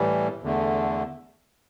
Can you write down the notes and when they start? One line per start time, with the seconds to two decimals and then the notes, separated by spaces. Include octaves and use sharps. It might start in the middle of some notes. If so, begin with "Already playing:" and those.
Already playing: A2 E3 G3
0.43 E2 D3 A3